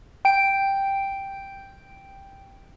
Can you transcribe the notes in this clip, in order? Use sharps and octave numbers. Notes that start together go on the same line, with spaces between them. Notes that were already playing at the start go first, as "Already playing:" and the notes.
G5 D7